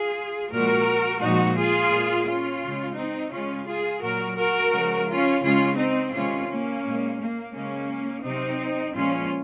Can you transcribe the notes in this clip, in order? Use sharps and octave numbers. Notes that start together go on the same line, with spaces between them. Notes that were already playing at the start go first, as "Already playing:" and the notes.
Already playing: F4 G#4
A#2 F3 G#3 F#4 A#4
A#2 F3 G#3 D#4 F#4
F4 G#4
A#2 G#3
C#4 F4
C#3 G#3
C4 D#4
C#3 G#3 C#4 F4
F4 G#4
A#2 F#3 F#4 A#4
F#4 A#4
C#3 F3 G#3
C#4 F4
C#3 G#3 C#4 F4
C4 D#4
C3 D#3 G#3 C#4 F4
A#3 C#4
A#2 G#3
A#3
C#3 G#3 A#3 C#4
C3 F#3 C4 D#4
A#2 F3 G#3 C#4 F4